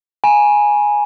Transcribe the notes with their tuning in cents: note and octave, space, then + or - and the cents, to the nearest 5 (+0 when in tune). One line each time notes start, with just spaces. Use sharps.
G#5 +0 B5 -40